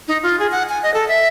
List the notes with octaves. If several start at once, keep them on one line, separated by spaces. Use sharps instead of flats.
D#4
F4
G#4
F#5
G#5
D#5
A4
E5